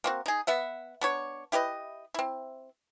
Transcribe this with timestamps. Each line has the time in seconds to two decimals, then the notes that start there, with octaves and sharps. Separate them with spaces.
0.04 A#3 C4 F#4
0.26 D#4 G#4
0.47 B3 E5 F#5
1.01 B3 D4 C#5
1.52 E4 G4 B4 D#5
2.14 C4 E4